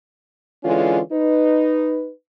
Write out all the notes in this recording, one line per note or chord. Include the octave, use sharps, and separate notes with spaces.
D3 E3 G#3 C#4 F4
D#4 B4